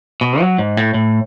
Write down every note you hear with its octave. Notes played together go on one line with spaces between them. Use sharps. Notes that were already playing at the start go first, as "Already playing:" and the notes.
B2
F#3
G#2
A2
A2